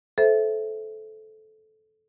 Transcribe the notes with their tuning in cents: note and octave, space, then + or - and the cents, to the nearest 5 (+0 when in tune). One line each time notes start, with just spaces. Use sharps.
A4 -15 C5 +0 E5 +0